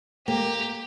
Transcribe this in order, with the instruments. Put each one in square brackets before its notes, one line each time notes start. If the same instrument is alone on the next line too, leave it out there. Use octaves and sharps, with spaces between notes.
[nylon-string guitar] A#3 [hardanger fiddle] G4